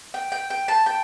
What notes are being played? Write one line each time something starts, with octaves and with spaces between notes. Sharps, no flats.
G5
G5
G5
A5
G5